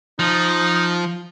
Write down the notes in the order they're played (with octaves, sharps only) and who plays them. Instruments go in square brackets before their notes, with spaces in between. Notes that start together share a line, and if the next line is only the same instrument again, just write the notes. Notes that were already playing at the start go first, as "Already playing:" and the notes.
[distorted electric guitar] F3 [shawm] D#4